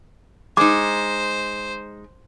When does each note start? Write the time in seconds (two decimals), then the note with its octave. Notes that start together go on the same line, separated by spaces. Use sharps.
0.57 G#3 D#4 C5 D6